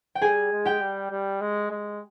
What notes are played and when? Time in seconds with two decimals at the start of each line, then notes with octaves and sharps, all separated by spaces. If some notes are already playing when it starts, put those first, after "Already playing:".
0.15 G5
0.22 G3 G#4 G#5
0.52 G#3
0.65 G4 G5
0.81 G3
1.11 G3
1.41 G#3
1.71 G#3